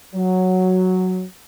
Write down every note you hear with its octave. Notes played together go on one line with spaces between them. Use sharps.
F#3